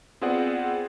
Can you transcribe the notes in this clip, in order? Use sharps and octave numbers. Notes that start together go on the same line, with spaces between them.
B3 C4 F4 G#4 D5 F#5